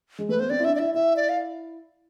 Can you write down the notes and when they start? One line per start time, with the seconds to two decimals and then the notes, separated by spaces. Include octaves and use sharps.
0.19 G#3
0.29 A3 B4
0.40 B3 C5
0.50 C4 D5
0.60 E4
0.64 D4 E5
0.75 D5
0.79 E4 E5
0.94 E4 E5
1.16 D5
1.29 F5